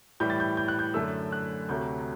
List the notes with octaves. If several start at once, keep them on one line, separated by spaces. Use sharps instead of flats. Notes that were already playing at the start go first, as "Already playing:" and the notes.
A2 E3 G3 G6
A6
G6
G6
F#6
G6
F#2 D3 A3 E6
F#6
D2 C3 F#3 A3 G6